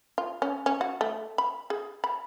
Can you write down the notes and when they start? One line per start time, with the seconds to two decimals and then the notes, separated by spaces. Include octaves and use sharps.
0.18 F4
0.42 C#4
0.66 C#4
0.81 F#4
1.01 A3
1.38 B5
1.70 G#4
2.04 B5